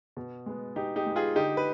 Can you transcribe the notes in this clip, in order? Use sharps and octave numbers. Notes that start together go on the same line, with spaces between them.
B2
G#3 B3
B2 D#4 G4
D#4 G4
G#3 B3
F4 G#4
D3 D#4 G4
B4